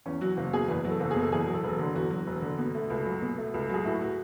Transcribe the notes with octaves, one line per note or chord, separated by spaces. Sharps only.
E2 C#4
F#3 F#4
F#1
B2 G#4
E2 B4
F#3
A4
F#1
G#4
B2
A4
E2 G#4
F#3
A4
E1
D3
E2 F#4
F#3
E1
D3
B2
A3
C#2
F#3
B2
A3
C#2
F#3 G#4
A2 F#4
F#4